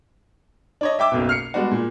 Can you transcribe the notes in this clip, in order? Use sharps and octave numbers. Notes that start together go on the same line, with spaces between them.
D4 C#5 D#5
E5 G5 D6 E6
F#1 B1 B2
F6 C7 C#7
G3 G#3 B3 D4 F#4
A#2